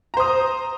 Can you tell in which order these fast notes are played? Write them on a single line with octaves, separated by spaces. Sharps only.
A#5 C5 D#6